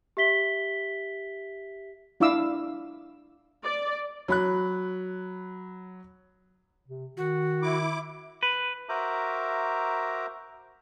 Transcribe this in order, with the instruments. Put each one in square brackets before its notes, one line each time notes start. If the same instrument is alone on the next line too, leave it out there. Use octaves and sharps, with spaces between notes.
[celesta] G4 E5 B6 G7
[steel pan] D4 E4 F5 D6 E6
[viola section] D5
[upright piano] F#3 B5 F#6
[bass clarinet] C3
[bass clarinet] D#3 [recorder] F#4
[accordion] E4 D6
[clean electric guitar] B4
[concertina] F#4 A#4 C5 E5 A#5 D6